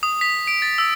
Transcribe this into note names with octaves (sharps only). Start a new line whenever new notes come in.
D#6
B6
D7
A6
E6